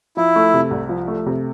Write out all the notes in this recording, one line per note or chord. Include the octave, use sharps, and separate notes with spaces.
F3 E4
A3
C3
C2
F3
A3
C3